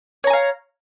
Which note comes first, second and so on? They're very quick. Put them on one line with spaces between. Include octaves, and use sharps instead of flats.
C#5 A#5 G#5 F5